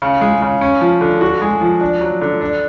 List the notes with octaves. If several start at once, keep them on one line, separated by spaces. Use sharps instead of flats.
C#3
G#3
C#3
C#4
F3
D3
F#4
G#3
F3
D4
F#3
D3
D4